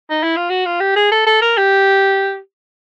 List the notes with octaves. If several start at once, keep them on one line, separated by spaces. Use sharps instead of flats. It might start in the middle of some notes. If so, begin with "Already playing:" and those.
D#4
E4
F4
F#4
F4
G4
G#4
A4
A4
A#4
G4